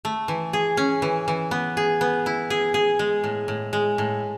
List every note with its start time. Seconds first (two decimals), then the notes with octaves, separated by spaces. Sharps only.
0.05 A3
0.28 E3
0.53 G#4
0.77 C#4
1.02 E3
1.28 E3
1.51 B3
1.77 G#4
2.01 B3
2.26 E4
2.50 G#4
2.74 G#4
2.99 G#3
3.24 A2
3.48 A2
3.73 G#3
3.98 A2